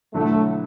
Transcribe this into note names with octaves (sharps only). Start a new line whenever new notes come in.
E1 E2 D3 F#3 A3